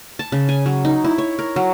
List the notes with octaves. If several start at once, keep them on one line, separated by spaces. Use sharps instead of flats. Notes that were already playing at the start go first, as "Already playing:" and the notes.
A5
C#3
G#5
F#3
D#4
E4
C#5
A#4
F#3